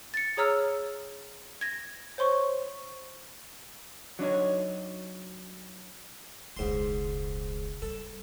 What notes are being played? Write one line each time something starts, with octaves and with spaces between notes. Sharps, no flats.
A6 C#7
G#4 C#5 A#5 E6 F6
G#6 A#6
C5 C#5 C6 C#6
F#3 D4 D#4 C#5
E1 C#2 G#2 C6
G3 A4